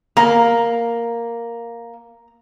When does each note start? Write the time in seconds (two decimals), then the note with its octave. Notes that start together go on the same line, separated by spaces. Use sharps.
0.17 A#3 A#5